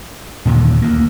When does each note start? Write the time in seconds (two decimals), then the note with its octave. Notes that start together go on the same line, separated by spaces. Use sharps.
0.45 D#2 A#2 D3 D#3
0.82 D2 A#3